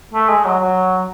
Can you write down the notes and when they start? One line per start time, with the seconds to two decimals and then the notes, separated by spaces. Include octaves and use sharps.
0.14 A3
0.29 G#3
0.45 F#3
0.59 F#3